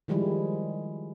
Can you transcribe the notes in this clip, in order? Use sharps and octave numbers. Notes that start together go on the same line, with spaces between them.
D#3 F3 G3 G#3 E4